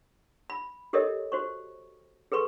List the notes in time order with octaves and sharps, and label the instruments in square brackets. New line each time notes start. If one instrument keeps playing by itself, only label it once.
[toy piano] B5
G4 A4 A#4 C#5 D#5 E5
F#4 C5 C#6
G#4 A4 B4 C6 C#6